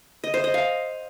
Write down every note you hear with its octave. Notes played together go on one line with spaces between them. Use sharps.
D#5
C5
D#5
F5